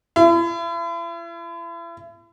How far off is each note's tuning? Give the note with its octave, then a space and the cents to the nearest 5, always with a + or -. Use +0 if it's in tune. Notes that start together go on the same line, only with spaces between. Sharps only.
E4 +40